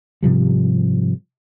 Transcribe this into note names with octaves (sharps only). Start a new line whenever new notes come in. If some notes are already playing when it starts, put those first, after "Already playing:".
G#2 C3 F3 G3